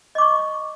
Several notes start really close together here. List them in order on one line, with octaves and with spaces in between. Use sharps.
D#5 D6 C#6